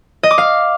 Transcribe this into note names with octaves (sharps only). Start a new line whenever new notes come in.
D#5
D6
F5